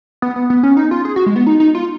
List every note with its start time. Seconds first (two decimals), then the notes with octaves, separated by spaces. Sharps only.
0.22 B3
0.36 B3
0.50 B3
0.63 C#4
0.77 D#4
0.91 F4
1.05 G#4
1.16 F#4
1.26 G#3
1.36 B3
1.47 D#4
1.60 D#4
1.75 F4